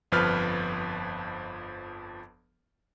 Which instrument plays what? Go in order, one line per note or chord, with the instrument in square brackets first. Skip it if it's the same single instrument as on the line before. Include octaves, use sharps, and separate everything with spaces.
[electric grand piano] G1 F2 F3 B4 F6